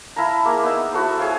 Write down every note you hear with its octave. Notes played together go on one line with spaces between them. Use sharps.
E4 F5 A5 A#5
A#3 G#4
B3 D#4 E5
E4 F#4 A4 C5
G#4 C#5 F5 G5